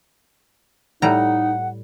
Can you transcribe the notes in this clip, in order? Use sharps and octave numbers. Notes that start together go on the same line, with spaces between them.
A2 G3 D#4 F#5 A#5